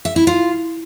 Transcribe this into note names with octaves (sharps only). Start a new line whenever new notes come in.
E5
E4
F4